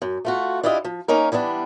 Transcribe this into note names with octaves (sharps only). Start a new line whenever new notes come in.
F#2
A3 F4 F#4
D4 E4 F4 G4 D#5
F3
A#3 C#4 D#4 A#4
E3 G3 B3 D4